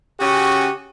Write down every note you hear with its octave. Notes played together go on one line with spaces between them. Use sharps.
C#3 C#4 F#4 G4